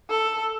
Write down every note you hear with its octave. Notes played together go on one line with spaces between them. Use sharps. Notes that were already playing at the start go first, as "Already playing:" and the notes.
A4